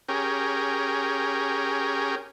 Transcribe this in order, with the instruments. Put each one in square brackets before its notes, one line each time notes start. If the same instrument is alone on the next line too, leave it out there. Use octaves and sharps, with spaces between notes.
[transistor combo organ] C#4 G4 G#4 A#4